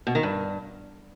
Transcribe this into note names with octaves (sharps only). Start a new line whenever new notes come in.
B2
D#3
G2